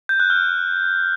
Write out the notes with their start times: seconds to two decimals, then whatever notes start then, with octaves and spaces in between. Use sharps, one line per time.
0.09 G6
0.20 F#6
0.30 F6